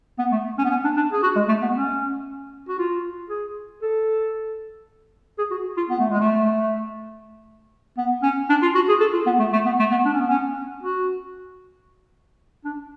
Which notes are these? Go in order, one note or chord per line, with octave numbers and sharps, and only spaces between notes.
B3
A3
C#4
B3
C#4
D4
D4
G#4
F#4
G#3
A3
B3
C#4
F#4
F4
G#4
A4
G#4
F#4
F4
B3
A3
G#3
A3
B3
C#4
D4
F4
F#4
G#4
A4
F4
B3
A3
A3
B3
A3
B3
D4
C#4
B3
C#4
F#4
D4